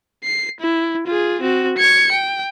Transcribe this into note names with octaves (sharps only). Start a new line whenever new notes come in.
C7
E4
F4 G#4
C4 F#4
G#6 C#7
G5